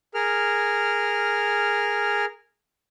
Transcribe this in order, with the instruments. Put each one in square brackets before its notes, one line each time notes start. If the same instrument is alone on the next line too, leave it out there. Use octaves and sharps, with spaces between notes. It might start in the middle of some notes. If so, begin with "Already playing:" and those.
[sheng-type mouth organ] G#4 A#4 F6